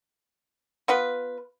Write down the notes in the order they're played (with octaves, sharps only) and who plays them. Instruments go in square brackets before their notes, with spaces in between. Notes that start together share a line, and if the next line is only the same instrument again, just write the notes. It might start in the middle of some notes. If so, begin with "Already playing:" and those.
[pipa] B3 F4 B4